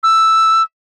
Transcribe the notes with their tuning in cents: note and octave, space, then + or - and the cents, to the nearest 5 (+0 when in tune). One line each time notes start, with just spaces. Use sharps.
E6 +0